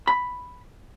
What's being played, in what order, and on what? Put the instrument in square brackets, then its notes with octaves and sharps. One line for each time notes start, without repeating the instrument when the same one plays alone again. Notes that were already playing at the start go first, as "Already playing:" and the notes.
[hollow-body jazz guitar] B5